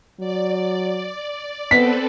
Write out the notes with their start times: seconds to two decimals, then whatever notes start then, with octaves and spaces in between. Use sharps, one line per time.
0.20 F#3 D5
1.71 B3 C4 A4 B4 B6